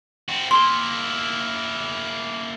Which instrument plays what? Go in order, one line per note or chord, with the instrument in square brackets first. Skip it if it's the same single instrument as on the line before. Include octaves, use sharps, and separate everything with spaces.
[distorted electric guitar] C4 F#4
[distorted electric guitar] A#3 E4 [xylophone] C6